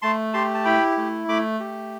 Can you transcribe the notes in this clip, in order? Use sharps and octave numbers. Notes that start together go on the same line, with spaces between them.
A3 A5 C6
G4 A5 C6
A5
E4 G5 B5
A3
A3 B5 D6
G4